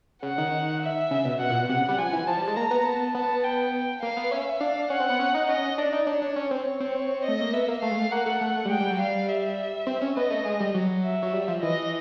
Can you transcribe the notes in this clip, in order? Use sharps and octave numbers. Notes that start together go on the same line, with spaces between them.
C#3 F#5
D#3
E5
C#3
B2
B2 F#5
A#2
B2
C3 F#5
C#3
G3
F3 G#5
E3
F3 A5
G3
G#3
A#3 A#5
B3
A5
B3 A5
G5
A#3 F5
B3
C#4 E5
D4 F5
C#4 F#5
C4
B3
C#4
D#4
C#4 D#5
D4 D5
D#4
D4 C#5
D4
C#4
C4
C#5
C4
C#5
A3 D#5
A#3
B3 E5
A#3
A3 F5
G#3
A3
A#3 F#5
A3
A3
G3
G#3 G5
G3
F#3
G3 F5
E5
C4
C#4
B3 D#5
A3
G#3
G3
F#3
E5
F#3
G3
F3
E3 D#5